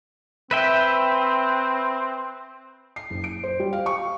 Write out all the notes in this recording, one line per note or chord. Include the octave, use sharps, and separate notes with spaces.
C4 B4 E5 G5
C7
F#1
D7
C5
G3
F5
C#6